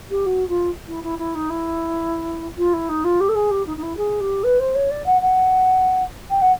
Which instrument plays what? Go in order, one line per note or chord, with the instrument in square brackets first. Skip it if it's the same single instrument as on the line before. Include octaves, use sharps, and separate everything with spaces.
[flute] G4
F#4
F4
E4
E4
E4
D#4
E4
F4
E4
D#4
F4
G4
A4
G#4
G4
D#4
D#4
E4
G#4
G4
B4
C5
C#5
D5
F#5
F#5
G5
F#5